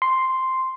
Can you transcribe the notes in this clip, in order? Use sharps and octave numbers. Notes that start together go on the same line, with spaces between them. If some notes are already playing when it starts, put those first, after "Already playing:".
C6